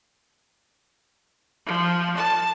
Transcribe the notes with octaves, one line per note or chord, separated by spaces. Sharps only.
F3
A5